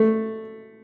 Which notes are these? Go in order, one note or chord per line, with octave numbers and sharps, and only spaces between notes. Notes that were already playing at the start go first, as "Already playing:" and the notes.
Already playing: A3